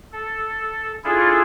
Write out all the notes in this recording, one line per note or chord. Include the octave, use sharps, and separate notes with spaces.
A4
D4 E4 F4 G#4 A4